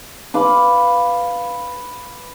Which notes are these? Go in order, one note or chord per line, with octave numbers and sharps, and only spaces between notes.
B4 F5 D6